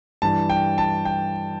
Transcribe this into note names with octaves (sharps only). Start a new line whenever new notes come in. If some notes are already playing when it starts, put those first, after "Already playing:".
G2 E3 A5
G5
A5
G5